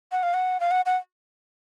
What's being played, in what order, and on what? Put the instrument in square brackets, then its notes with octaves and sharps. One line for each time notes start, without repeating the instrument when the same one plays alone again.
[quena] F#5
F5
F#5
F5
F#5
F#5